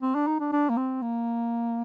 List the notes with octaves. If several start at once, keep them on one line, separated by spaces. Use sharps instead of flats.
C4
D4
D#4
D4
D4
A#3
C4
A#3